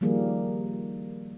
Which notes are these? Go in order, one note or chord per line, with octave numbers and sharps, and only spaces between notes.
D#3 F3 G3 A#3 G#4